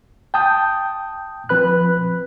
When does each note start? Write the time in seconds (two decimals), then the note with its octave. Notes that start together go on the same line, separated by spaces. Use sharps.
0.34 G5 A5 D#6 G6
1.49 F3 C4 B4 B5 F#6